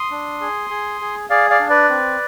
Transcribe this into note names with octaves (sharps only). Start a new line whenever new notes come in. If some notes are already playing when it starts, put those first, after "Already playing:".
Already playing: C6 D#6
D4
G#4
G#4
G#4
G#4 D5 F5
D5 F5
D4
B4 D5
C4